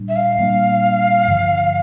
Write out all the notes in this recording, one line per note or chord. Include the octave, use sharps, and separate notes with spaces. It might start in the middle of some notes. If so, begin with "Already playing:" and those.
Already playing: A#2 G3 D4
E5
F5
A#2 G3 A#3 D4
G2 D3 F3